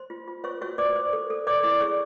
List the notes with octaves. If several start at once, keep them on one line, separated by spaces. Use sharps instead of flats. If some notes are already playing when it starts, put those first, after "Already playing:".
Already playing: C5 C6
F4
F4
C5 C#5 C#6
F#4 C#5 C#6
C5 D5 D6
C5
A4
A4
C#5 D5 D6
E4 D5 D6
G#4 C#5 C#6